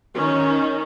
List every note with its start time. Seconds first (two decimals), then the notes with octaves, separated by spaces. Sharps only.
0.16 D#3 C#4